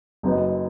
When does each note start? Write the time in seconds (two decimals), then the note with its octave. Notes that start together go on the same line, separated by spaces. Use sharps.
0.23 F#1 F#2 F#3 D#4 B4